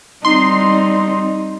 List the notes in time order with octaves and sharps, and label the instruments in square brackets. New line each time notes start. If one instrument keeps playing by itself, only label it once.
[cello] G3 C4 [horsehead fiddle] D#4 [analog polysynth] C6